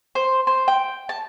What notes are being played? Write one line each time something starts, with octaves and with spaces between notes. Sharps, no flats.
C5
C5
G5
A5